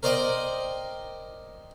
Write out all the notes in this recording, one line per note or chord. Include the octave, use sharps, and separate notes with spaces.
A#4 C5 D5 D#5 G5